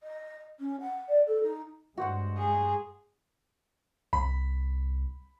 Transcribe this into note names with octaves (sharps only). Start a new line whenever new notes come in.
D#5
C#4
F#5
D5
A4
D#4
G2 G#3 F#4 C5 F#5
G#4
C2 B5